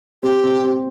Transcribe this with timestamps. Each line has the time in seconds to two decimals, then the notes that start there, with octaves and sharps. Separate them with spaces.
0.23 C4 G4
0.43 C4
0.64 C4